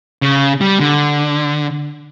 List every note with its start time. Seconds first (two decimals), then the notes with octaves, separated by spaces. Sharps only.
0.22 C#3
0.61 G3
0.80 D3